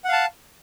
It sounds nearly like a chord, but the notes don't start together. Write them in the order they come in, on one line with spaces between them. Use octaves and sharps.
F#5 F5 A5